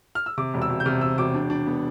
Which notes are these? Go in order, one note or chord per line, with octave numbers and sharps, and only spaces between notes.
F6
E6
C3 D6
E1
E6
E1
G6
C3 F6
E1 E6
E1 D6
D4
D4
B3